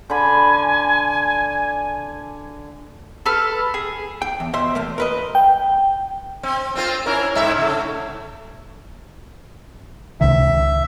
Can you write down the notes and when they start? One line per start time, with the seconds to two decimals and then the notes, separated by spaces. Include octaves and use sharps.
0.10 D3 G#5 B5
3.26 A4 B4 F6
3.74 G#4
4.22 G5
4.40 E2
4.53 B2 C5 E5 C6
4.75 E2 A3 A#3
4.98 A#4 B4 D#5
5.35 G5
6.43 C4
6.75 C4 F4 C5
7.06 C#4 E4 A#4
7.35 G#2 E4 E5
7.57 C#3 A3
10.21 C#2 C3 D#3 E5